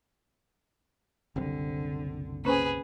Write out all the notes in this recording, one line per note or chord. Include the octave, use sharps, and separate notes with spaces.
F#1 C2 D3 C4
A#3 C#4 G#4 B4 C5